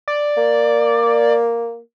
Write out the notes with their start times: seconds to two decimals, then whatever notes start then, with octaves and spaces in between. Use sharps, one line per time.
0.08 D5
0.37 A#3